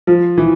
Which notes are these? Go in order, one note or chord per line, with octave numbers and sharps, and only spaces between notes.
F3
E3